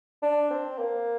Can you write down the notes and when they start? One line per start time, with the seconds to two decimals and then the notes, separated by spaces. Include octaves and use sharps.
0.22 D4
0.51 C4
0.78 A#3